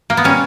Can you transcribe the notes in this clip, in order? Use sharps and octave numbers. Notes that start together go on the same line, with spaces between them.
A#3
B3
A#2 G3 C#4